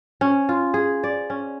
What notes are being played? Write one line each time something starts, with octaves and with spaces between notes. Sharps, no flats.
C#4
F4
G#4
D5
C#4